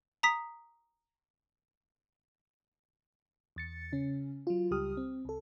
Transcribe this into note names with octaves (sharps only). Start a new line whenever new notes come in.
A#5 D#6 B6
E2 A6 C#7
C#3 C#4
F#3 F4
C#2 G3 G4 D#6 F6
C4
C2 A4